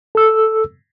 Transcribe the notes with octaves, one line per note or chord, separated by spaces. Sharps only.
A4 E6